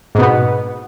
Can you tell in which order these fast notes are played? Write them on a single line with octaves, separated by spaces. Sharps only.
G#2 B2 B3